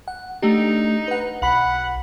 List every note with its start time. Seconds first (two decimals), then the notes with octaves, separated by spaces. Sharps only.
0.08 F#5
0.42 A3 D4 D#4 G4
1.08 B4 F#5
1.42 B1 F#5 B5 B6